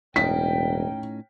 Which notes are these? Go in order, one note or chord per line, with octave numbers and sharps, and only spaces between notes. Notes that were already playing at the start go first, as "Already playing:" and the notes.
E1 A2 C#4 D#4 G5 B6